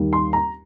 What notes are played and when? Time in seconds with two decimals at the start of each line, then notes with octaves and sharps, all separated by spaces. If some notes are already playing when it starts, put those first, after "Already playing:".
Already playing: D#2 D#3 G3
0.13 C6
0.33 A#5